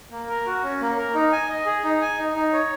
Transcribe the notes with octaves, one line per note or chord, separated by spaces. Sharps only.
A#3
A#4
F#4
C#4
A#3
A#4
D#4
G#5
D#5
G#4
D#4
G#5
D#4
D#4
C#5